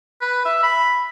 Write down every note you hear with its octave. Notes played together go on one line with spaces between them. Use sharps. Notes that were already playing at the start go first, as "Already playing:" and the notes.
B4
E5
B5